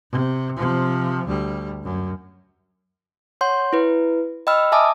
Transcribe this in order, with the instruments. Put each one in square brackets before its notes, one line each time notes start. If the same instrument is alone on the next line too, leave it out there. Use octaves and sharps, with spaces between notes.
[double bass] C3
C3 F3
D2 G3
F#2
[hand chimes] C#5 F#5 C6 G6
E4 B4
D#5 G5 B5 E6 F6
E5 G#5 A5 D6 D#6